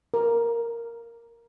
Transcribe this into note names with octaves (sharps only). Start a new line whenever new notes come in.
A#4